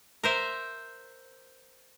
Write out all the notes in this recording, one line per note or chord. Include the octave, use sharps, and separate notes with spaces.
A#4 C5 E5